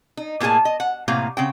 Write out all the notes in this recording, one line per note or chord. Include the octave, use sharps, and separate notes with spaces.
D#4
A2 A#3 B3 G#4 G#5 A5
D#5
F#5
A2 C3 A#3 F5 A#5
C#3 C4 G5